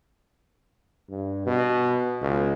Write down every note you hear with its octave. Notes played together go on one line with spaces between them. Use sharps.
G2
B2
C#2